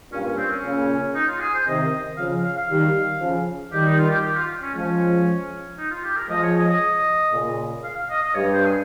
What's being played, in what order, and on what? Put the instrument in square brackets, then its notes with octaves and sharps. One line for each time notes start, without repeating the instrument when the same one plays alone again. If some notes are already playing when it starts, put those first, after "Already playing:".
[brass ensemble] G2 A#2 [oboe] C#4
[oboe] C#4
C4
C#4
[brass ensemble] A#2 C#3
[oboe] D#4
F4
G#4
C5
[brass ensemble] C3 D#3 [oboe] D#5
[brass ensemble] C#3 F3 [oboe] F5
[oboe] F5
F5
[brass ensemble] D#3 G3
C#3 F3
[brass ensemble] D#3 G3 [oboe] G4
[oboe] D#4
F4
G4
G4
F4
C#4
[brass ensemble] F3 G#3 [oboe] C#4
[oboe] D#4
F4
G4
A#4
[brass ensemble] F3 G#3 [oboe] D#5
[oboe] C#5
D#5
D#5
[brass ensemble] A#2 C#3
[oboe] F5
F5
D#5
D#5
[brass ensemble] G2 [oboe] C#5
[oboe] C5
G#4